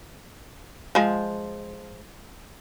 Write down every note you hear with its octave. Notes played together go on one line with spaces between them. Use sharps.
F3 G#3